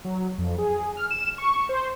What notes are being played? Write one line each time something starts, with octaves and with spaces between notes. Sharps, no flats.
F#3
F2
G#4
F6
E7
C#6
C5